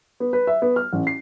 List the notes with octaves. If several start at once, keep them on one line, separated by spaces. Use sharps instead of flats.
B3
B4
E5
B3
F6
A1
C7